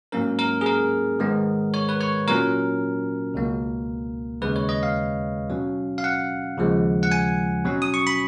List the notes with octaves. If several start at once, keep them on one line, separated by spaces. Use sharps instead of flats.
G#2 F#3 A#3 C#4 A#4
A#4
G#4
A#4
G#2 D#3 G#3 B3
C#5
B4
C#5
A#2 F#3 C#4 A#4
C#2 B2 A#3
D#2 C#3 G#3 B4
C#5
D#5
F5
B2 F#3 C#4
F5
F#5
D#2 C#3 F3 G#3
F#5
G#5
B2 F#3 C#4
D#6
C#6
B5